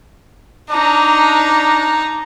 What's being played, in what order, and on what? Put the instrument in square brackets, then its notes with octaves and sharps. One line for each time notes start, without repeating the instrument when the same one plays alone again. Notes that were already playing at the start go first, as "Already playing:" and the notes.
[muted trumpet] D4 [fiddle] D#4 A#5